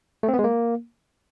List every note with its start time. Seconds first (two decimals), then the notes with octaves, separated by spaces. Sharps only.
0.23 A3
0.28 C4
0.34 B3
0.39 G#3
0.44 A#3